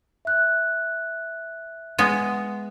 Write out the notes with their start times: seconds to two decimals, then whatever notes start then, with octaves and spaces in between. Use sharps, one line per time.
0.25 E5 F#6
1.99 G#3 B3